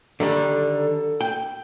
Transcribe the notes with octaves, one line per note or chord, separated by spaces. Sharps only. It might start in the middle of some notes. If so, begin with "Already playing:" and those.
D3 D#3 G3 A4
G5